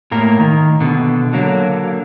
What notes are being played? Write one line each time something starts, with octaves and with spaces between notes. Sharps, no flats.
A2 A#3 A#4
D#3
B2 D3
D3 F#3 A#3